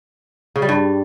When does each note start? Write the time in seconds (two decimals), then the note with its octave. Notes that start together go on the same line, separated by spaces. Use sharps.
0.56 C#3
0.62 G3
0.69 G2